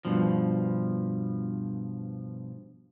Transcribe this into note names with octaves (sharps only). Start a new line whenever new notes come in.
G2 B2 F3